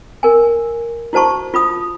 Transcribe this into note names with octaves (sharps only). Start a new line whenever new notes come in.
A#4 G#5
E4 F#4 C5 A5 C#6
F4 B5 D#6